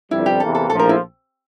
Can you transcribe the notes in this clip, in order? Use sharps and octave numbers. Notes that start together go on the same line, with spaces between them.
G1 F2 C3 G3 E4
G4
E2 C3 E3 A#3 A4
A4
A#1 A2 F3 A4
A#4
E4